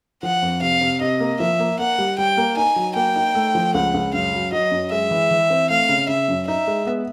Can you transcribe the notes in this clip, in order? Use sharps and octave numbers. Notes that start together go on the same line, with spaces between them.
F3 F#5
F2
C3 F5
C3
C3 D#5
A#3
F3 E5
A#3
A#3 F#5
G3
G3 G5
A#3
D#4 G#5
F#3
A#3 G5
D#4
A3
F3
C#2 F#5
C#2
F#2 F5
F#3
F#3 D#5
F#2
G#3 E5
E3
E3
C4
A3 F5
C#3
C#3 E5
F#2
D#4 E5
G#3
B3